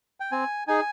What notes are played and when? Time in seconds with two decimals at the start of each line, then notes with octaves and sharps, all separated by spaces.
0.20 G5
0.32 C4 G#5
0.68 D#4 G#4 G#5